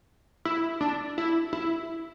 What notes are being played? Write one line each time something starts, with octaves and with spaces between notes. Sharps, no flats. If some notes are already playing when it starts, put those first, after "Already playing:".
E4
D4
E4
E4